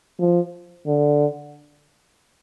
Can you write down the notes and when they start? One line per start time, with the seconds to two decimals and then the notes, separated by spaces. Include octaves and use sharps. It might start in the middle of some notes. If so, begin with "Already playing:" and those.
0.20 F3
0.86 D3